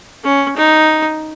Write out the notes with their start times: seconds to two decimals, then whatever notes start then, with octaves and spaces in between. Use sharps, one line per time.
0.24 C#4
0.57 D#4